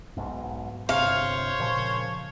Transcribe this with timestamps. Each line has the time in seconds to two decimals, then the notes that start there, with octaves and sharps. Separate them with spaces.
0.17 B1 G#2 B2
0.89 G1 C3 C5 C#5 F5
1.60 A#2 C#3 F3